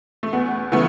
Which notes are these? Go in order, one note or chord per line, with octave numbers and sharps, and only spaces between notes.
A3
E2 B3
C#3 E3 A3 B3